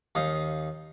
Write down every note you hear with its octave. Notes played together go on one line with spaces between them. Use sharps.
D#2 D#4 D#5 F5